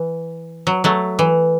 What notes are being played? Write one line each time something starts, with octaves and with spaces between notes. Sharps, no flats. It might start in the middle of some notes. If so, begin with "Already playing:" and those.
Already playing: E3
F#3
F#3 A3
E3